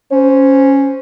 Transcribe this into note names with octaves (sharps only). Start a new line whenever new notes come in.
C#4 C5